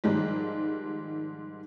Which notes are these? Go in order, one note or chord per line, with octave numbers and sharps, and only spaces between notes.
G#2 D#3 F3 G3 G#3